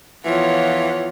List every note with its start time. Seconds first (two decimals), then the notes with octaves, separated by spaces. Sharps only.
0.25 E2 E3 F3 F4 C#5 F#5